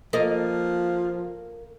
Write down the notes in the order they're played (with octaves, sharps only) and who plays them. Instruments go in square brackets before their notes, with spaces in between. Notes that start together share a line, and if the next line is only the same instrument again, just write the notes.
[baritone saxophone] F3 [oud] A#3 A4 D#5